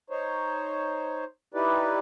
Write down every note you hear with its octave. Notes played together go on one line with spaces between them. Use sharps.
D#4 C5 C#5
D#4 E4 G4 B4 D5